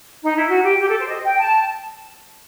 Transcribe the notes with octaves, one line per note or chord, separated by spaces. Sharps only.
D#4
E4
F#4
G4
G4
A4
C5
D#5
G5
A5